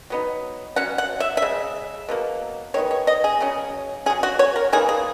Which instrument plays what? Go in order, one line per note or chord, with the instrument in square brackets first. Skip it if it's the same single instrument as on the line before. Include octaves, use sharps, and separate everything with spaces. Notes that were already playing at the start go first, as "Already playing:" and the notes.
[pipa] F#3 B3 D#4
F#3 C#4 F#5
F#5
E5
E5
C#3 G#3
B2 F#3 A#3
D#3 G#3 B3 C#5
C#5
D#5
G#4
C#3 F#3 C#4
C#4 G#4
F#3
F#4
C#5
A#4
E3 A#3 D#4 G#4
G#4